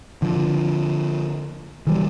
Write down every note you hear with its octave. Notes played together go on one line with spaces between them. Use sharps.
D3 F3
D#3 E3 F#3 G3